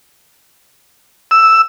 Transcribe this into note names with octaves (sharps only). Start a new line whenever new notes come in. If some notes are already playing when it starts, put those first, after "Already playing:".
E6